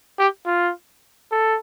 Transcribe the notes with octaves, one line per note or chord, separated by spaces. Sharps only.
G4
F4
A4